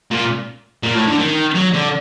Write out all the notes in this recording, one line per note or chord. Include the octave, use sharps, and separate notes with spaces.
A#2
A#2
A2
D3
D#3
F#3
D3